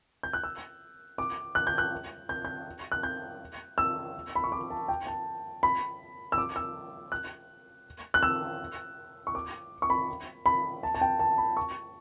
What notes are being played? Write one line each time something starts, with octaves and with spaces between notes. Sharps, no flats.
G6
F#6
E6
D6
F#6
G6
F#6
G6
G6
F#6
G6
E6
B5
C#6
D6
A5
G5
A5
B5
E6
D6
E6
F#6
F#6
E6
C#6
D6
C#6
B5
B5
A5
A5
G5
A5
B5
C#6